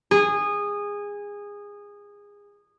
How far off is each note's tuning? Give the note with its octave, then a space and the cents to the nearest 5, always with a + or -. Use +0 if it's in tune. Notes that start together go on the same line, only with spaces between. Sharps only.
G#4 -20